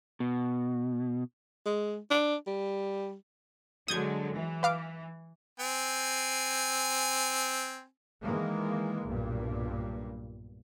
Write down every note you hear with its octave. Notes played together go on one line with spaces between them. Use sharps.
B2
G#3
D4
G3
D3 F#3 G#3 D#6 G6 G#6
E3
B4 F5 D6
C4 G#5
D#3 E3 G#3 A#3
B1 G2 A#2